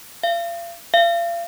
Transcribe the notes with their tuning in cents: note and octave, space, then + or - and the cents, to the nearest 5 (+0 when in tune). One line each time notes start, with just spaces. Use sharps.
F5 -40
F5 -40